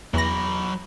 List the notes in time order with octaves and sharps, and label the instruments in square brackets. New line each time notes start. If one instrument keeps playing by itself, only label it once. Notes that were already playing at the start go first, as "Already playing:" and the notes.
[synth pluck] E2 A#6 [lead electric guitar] F#3 B5